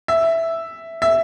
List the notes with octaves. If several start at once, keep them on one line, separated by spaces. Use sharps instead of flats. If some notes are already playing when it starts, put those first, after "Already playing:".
E5
E5